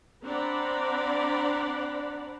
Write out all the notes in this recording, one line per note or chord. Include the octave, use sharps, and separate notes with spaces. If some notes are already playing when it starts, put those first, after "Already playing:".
C4 D4 D5 F#5 A#5 B5